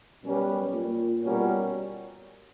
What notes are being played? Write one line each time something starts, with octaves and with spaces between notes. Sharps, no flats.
F#2 B2 G3 C#4 G4 B4
A#2
B2 G3 C#4 F#4 A#4